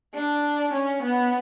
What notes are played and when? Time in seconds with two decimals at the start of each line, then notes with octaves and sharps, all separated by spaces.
0.14 D4
0.73 C#4
1.02 B3